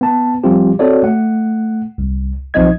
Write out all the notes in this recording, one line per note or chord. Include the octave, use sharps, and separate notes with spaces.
B3 A5
F3 G3 C4 F4 G4
C4 F#4 A4 C#5 D5
A3 F#5
C2
B1 F3 C4 D#4 D#5 G#6